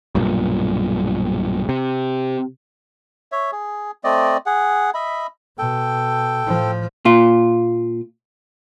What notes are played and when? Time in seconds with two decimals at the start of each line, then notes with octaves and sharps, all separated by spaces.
0.15 B1 G2 A#2
1.69 C3
3.32 C#5 E5
3.52 G#4
4.04 A3 C4 D5 D#5
4.46 G#4 F#5
4.94 D#5 E5 B5
5.58 B2 A4 G5
6.46 A2 F3
7.05 A#2 F4